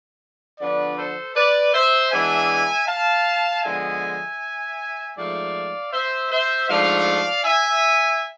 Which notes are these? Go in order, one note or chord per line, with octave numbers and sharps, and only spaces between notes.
D3 F3 B3 D4 B4 D5
A4 C5
B4 D5
C5 E5
E3 G#3 B3 D4 E5 G#5
F5 A5
D3 F3 G#3 B3 E5 G#5
G#2 F3 A3 D5 F5
C5 E5
C5 E5
G#2 F3 A3 D4 D5 F5
E5 G#5